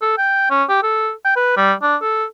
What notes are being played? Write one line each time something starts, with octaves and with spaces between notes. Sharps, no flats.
A4
G5
C#4
G4
A4
G5
B4
G3
D4
A4